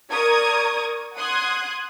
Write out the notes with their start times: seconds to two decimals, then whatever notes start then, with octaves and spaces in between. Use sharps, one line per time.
0.12 A#4 D5 C#6 D#6 G#6
1.16 F#5 C6 D#6 F#6 G#6